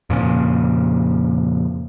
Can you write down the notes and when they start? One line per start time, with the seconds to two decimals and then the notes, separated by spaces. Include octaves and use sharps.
0.10 F2 A#2 C#3